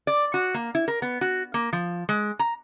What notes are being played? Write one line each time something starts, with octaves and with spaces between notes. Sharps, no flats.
D5
F#4
A#3
E4
A#4
B3
F#4
A#3
F3
G#3
A#5